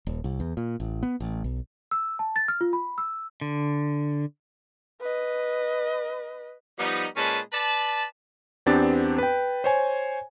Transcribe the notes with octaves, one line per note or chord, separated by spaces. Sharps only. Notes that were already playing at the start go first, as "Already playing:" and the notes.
D#1
C2
E2
A#2
A1
B3
A1
B1
E6
A5
A6
F6
F4
B5
E6
D3
B4 D#5
F3 G3 B3 D#4
A#2 G#3 C#4 B4 A5
B4 D5 A5
E2 B3 C4 D4 G4 A6
B4 G5
C5 C#5 G#5